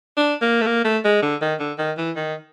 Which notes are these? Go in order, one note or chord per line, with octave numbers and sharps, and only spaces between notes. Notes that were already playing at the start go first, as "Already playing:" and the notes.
D4
A#3
A3
A#3
A3
G#3
D3
D#3
D3
D#3
E3
D#3